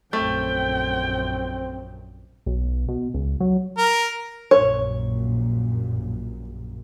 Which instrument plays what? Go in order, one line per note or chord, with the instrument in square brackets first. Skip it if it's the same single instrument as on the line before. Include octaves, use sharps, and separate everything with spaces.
[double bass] A#1 F#2 [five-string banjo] A3 [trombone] C4 [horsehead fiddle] G5
[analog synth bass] B1
B2
C#2
F#3
[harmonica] A#4
[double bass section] A#1 F#2 A#2 [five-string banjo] C#5